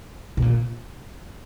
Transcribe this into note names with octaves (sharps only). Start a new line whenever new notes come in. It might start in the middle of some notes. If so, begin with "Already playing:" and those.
B2
A#2